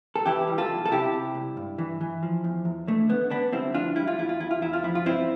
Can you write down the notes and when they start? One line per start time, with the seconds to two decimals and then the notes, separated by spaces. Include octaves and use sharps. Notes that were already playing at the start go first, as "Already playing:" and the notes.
0.16 A4
0.26 E3 E4 G4
0.48 G3
0.58 F4 A4
0.70 B1
0.86 A4
0.91 C3 E4 G4
1.13 C3
1.35 C2
1.57 G2
1.78 E3
2.01 E3
2.23 F3
2.44 E2
2.65 E2
2.88 D3 A3
3.09 D3 B3
3.30 D3 B3 D4
3.53 G3 C4 E4
3.74 F2 D4 F4
3.96 G3 E4
4.07 F4
4.18 E2 E4
4.29 F4
4.40 E2 E4
4.51 F4
4.62 E2 E4
4.73 F4
4.84 F3 E4
4.95 F4
5.05 G2 C4 E4